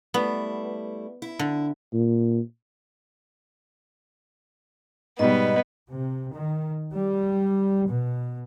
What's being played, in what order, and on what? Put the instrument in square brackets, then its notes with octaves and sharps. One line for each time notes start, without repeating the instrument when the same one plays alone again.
[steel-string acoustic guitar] G3 A3 E4 [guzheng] B3
[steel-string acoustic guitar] E4
[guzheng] D3
[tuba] A#2
[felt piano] G#2 B2 G3 [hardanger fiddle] B3 [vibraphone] D#5
[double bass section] C3
D#3
G3
B2